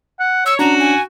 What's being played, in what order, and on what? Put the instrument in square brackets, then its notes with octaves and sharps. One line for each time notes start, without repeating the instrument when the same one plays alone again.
[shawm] F#5
[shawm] C#5 [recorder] E6
[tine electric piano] C#4 D4 [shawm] F#4 [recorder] A#5
[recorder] G#5